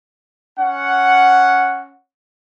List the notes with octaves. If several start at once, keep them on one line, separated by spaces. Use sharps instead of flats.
C#4 F#5